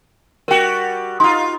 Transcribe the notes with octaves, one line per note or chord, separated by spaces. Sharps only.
G3 F#4 A#4 G5
D#4 F4 C6